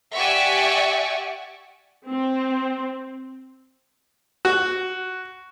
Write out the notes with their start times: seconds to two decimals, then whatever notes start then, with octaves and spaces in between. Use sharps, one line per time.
0.14 G4 D5 E5 F#5 G#5 C#6
2.09 C4
4.45 F#4